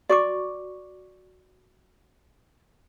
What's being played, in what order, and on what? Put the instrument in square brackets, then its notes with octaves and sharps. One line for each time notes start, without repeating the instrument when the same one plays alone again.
[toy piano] F#4 C#6 D6 [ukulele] D5